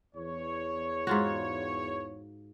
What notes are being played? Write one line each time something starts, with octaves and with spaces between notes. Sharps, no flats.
E2 C#5
G#2 F4 F#4